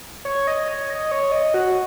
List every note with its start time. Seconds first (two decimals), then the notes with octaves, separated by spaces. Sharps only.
0.25 C#5
0.47 D#5
0.68 C#5
0.90 D#5
1.11 C#5
1.32 D#5
1.54 F#4